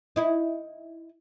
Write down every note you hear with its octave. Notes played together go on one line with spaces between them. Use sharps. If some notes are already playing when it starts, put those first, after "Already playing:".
D#4 E4